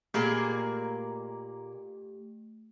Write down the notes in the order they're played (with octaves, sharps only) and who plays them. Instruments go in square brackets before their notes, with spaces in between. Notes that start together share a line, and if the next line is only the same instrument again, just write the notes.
[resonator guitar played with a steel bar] A#2 A#3 G#4 [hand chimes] A3 G4